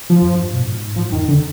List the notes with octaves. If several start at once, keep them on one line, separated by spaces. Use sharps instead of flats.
F3
F2
G2
B2
G#2
G#2 F3
F2 D#3
D3